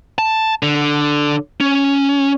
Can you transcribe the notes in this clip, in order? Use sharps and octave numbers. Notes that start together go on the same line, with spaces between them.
A5
D3
C#4